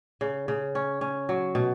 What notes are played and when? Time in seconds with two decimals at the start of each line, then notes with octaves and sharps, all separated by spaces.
0.21 C#3
0.48 C#3
0.75 C#4
1.01 C#4
1.29 F#3
1.55 B2